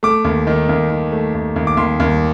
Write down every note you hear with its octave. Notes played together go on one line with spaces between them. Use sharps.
A3 D6
D#2
D#3
D#2
D#3
A3
D#2
D#2
D6
D#2 C6
D#2